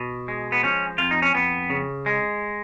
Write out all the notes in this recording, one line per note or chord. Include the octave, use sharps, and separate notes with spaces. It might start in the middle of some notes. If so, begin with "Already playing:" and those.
Already playing: B2
G#3
B3
F3 C#4
F2 F4
D#4
C#4
F2 B3
C#3
G#3